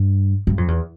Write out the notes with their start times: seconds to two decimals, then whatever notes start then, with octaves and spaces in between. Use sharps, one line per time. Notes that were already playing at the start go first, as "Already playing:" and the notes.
Already playing: G2
0.47 G2
0.58 F2
0.68 E2